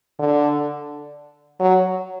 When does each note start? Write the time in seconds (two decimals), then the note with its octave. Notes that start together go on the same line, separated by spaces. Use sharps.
0.19 D3
1.60 F#3